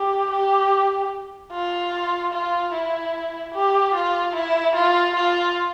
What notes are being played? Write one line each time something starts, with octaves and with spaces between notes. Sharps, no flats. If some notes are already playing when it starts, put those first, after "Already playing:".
Already playing: G4
G4
F4
F4
E4
G4
F4
E4
F4
F4